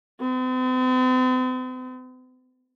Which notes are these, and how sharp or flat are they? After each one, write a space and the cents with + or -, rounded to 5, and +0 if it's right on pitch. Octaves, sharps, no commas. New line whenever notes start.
C4 -45